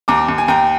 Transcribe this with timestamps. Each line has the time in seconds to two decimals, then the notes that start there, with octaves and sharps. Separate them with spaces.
0.08 D#2 A#5 D6
0.28 D#2
0.38 G#5
0.48 D#2 G5 A#5